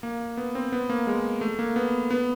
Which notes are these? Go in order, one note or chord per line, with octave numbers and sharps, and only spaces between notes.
A#3
B3
C4
B3
A#3
G#3
A3
A#3
B3
B3